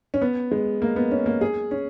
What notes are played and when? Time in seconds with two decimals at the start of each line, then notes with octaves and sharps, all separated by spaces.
0.14 C#4
0.22 B3
0.51 G#3
0.82 A#3
0.96 B3
1.11 C#4
1.26 A#3
1.41 G#4
1.71 C#4